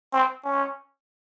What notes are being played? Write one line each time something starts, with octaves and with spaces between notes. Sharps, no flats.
C4
C#4